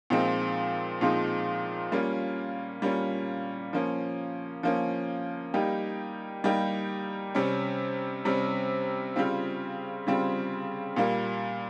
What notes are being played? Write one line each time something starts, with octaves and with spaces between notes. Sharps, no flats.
A#2 F3 G#3 C4 D#4
A#2 F3 G#3 C4 D#4
G3 A#3 C#4 F4
G3 A#3 C#4 F4
F3 A#3 C#4
F3 A#3 C#4
G3 A#3 D#4 G4
G3 A#3 D#4 G4
C3 G3 C#4
C3 G3 C#4
C#3 G3 C4 F4
C#3 G3 C4 F4
A#2 G3 A#3